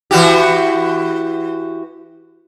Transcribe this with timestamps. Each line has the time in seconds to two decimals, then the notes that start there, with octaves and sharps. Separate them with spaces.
0.11 E3 F#4 G4